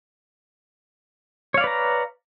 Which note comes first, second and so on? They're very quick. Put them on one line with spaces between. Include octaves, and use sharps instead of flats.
C#5 F5 D5 B4 A#5